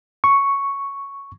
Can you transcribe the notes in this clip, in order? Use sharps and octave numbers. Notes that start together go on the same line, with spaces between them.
C#6